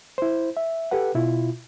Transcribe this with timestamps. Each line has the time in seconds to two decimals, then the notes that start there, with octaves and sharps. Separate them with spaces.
0.18 E4 C5
0.57 E5
0.91 G4 A4 B4 F#5
1.15 B2 E4 F4